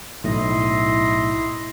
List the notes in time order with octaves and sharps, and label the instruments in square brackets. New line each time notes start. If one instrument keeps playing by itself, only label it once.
[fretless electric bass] B1 A2 [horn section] E4 D#5 C6